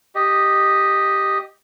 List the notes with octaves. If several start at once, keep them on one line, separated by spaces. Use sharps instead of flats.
G4 D#5